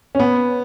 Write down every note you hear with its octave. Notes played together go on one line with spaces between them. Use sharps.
C#4
B3